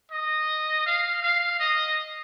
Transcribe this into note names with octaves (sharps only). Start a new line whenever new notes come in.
D#5
F5
F5
D#5